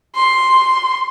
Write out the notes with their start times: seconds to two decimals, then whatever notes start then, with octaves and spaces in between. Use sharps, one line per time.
0.16 C6